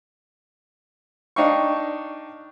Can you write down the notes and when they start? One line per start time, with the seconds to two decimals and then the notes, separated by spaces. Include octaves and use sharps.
1.36 D4 D#4 F5 G5 C#6